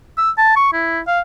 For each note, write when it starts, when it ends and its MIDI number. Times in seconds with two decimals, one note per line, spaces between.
0.18 0.31 88
0.38 0.56 81
0.56 0.69 85
0.73 1.00 64
1.08 1.20 77